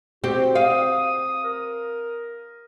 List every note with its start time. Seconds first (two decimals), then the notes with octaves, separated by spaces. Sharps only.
0.24 C4 F#4 G4
0.55 F5 D#6
1.44 A#4